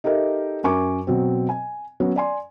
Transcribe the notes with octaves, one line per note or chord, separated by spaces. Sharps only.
D#4 G4 A4 A#4 D#5 E5
F#2 A#4 G#5 C#6 D6
B2 F#3 C4
G#5
F#3 B3 C#4 C#5
D5 G#5 C6